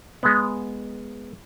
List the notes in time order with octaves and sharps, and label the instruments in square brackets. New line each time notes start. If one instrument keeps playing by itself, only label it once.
[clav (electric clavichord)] G#3 B3